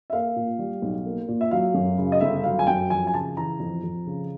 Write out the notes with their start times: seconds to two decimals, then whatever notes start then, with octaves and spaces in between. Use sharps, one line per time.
0.10 E5
0.13 A#3 F5
0.36 A#2
0.59 G3
0.82 B1
1.06 A#3
1.28 A#2
1.41 E5
1.51 F#3 F5
1.74 F#2
1.98 C#3
2.12 D#5
2.21 G1 E5
2.44 F#3 F5
2.59 G#5
2.67 F#2 G5
2.90 F2 G#5
3.07 G#5
3.14 C#3 A5
3.37 E3 A#5
3.60 F2
3.83 F2
4.07 C#3